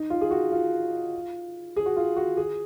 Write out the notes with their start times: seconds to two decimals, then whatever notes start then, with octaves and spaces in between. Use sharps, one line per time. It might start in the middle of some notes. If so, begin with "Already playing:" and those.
Already playing: D#4
0.10 F4
0.21 G#4
0.31 F#4
0.52 F4
1.76 G#4
1.86 F#4
1.97 F4
2.17 F#4
2.37 G#4